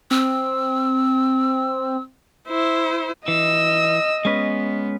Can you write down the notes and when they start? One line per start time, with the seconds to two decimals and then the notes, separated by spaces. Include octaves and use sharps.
0.11 C4 E6
2.48 E4 C5
3.28 E3 D#5 E6
4.25 G#3 B3 C#4 B4